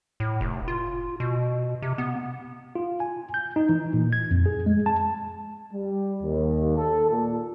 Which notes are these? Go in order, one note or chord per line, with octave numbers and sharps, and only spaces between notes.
A2
F1
F4
B2
C3
B3
F4
G#5
G6
D#4
E3
A#2
G#6
F2
G#4
G#3
A5
G3
D#2
A4
A#2